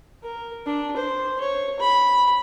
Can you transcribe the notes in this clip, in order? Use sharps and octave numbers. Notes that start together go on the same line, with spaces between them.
A#4
D4
C5
C#5
B5